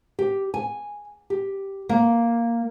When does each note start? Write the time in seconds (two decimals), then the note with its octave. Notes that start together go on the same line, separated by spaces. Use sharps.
0.19 G4
0.54 G#5
1.30 G4
1.89 A#3